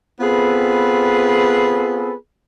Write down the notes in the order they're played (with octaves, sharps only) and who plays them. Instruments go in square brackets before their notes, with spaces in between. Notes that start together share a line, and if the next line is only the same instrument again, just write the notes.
[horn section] B3 C4 F4 G#4 A4 B4